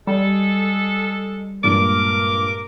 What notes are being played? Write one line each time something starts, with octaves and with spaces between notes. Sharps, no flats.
G3 G#3 A4
G2 A#2 G#3 A#4 D6